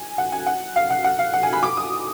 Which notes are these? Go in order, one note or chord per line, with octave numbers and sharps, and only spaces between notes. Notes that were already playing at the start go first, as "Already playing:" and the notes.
Already playing: G#5
F#5
G#5
F#5
F5
F#5
F#5
F5
F#5
G#5
B5
D6
D#6